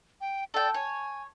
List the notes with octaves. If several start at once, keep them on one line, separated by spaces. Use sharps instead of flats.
G5
A4 D5 G5
C#5 G#5